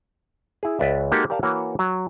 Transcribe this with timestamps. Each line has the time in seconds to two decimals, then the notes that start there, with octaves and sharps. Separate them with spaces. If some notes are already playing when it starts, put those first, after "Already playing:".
0.63 E4 G#4
0.79 C#2 B4 D5 E5
1.12 G#3 A#3 D#4 F#4 G4 A4
1.30 G4 A#4 D5 F5 A5
1.43 E3 A#3 F#4 C#5
1.79 F#3